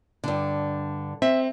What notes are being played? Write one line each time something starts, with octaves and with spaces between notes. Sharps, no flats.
G2 D3
C4 E5